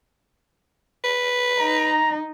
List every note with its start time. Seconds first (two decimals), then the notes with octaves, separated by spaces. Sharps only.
1.04 B4
1.59 D#4 A#5